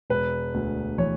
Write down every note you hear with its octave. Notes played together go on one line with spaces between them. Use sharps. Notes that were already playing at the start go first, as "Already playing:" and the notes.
E1 B4
D2
E3 C#5